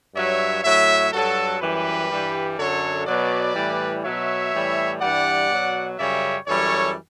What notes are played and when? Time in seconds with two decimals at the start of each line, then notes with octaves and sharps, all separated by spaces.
0.15 G2 F#3 C#5 E5
0.64 A2 F#3 C#5 E5
1.13 G2 F#3 F#4 A4
1.61 F#2 E3 G3 G4 B4
2.10 G2 E3 G3
2.58 F#2 D3 F#3 A4 C#5
3.07 B2 F#3 B4 D5
3.56 A2 E3 G3
4.04 B2 F#3 C#5 E5
4.53 A2 E3 G3
5.01 G2 E3 G3 D5 F#5
5.50 B2 F#3
5.99 F#2 C#3 G3 C#5 E5
6.47 F#2 E3 G3 A4 C#5